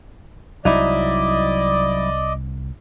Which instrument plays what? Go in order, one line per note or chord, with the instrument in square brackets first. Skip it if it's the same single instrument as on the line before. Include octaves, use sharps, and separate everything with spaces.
[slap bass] C2 [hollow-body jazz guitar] F#3 D#4 E4 [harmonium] D5 D#5